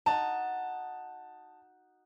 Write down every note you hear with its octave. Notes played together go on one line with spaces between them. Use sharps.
D#4 F#4 A5